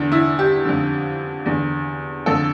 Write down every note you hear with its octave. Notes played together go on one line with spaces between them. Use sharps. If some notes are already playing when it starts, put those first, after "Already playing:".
Already playing: E2 D3 D4
E4
G4
F2 D3
E2 D3
F2 D3 A4